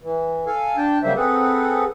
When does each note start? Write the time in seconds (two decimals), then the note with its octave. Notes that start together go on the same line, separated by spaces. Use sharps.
0.02 E3
0.47 A4 F5 G#5
0.77 D4 G5 A5
1.03 C#3 F#3 G3 A#3 C5 E5
1.16 C4 G#4 A4 B4 F#5